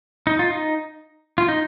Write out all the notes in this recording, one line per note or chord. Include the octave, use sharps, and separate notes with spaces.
D#4
F4
D#4
F4
D#4